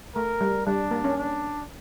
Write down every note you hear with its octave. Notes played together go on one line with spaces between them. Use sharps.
A3 A#4
G3
G3 D4
A#3
C#4
D4